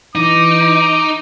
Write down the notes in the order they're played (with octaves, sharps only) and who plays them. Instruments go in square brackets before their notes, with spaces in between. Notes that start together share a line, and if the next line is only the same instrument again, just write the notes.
[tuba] E3 [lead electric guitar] D#4 [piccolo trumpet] D6